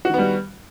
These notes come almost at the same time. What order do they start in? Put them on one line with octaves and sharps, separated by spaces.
F#4 D#3 B3 G3